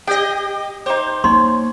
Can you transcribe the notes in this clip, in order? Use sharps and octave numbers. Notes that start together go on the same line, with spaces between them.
G4 D#5 G5
D#4 G4 C5
A#3 D#4 C#5 C6